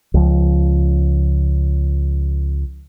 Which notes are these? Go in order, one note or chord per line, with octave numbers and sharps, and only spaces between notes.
C#2 F3